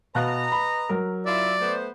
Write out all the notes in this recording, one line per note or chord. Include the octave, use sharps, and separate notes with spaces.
B2 B4 D#5 F5 A#5 F#6
B5
F#3 A#4
E4 F4 D5 E5
A3 B3 C5